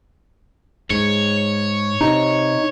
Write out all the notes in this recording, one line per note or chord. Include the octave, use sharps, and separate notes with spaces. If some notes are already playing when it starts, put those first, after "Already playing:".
G#2 C#5
C3 D#4